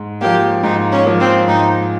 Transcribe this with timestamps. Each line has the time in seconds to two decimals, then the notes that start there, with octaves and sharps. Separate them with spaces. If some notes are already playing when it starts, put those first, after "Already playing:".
Already playing: G#2
0.21 F3 A#3 G4
0.63 G#2 D#4
0.92 C#4
1.05 F3 A#3
1.20 C4
1.47 G#2 D#4